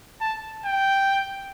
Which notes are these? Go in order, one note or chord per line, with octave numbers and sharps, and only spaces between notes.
A5
G5